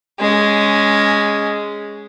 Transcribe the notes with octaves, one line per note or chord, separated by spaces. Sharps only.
G#3 C#4